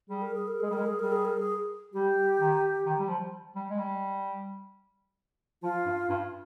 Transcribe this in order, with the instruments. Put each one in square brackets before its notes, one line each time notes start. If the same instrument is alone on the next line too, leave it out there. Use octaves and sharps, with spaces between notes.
[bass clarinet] G3 [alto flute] G#4
[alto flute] A#4
G#4
A#4
[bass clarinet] G#3 [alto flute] G#4
[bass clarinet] G3
[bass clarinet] G#3 [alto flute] A#4
[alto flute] G#4
[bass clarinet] G3 [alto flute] A#4
[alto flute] G#4
A#4
G#4
[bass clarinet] G3 [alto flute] G4
[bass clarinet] D#3
D#3
G3
F3
G3
G#3
G3
[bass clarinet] F3 [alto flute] F4
[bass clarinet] G2
G2